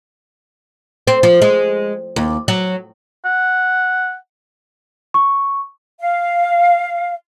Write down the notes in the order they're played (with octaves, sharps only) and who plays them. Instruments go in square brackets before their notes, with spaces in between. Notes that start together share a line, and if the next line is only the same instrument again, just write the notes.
[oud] C4
F3
G#3
D#2
F#3
[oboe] F#5
[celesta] C#6
[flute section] F5